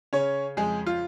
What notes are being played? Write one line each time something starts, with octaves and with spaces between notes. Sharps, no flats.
C#3 C#4 C#5
F2 G#3 G#4
F4